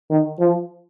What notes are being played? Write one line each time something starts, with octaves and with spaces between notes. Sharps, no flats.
D#3
F3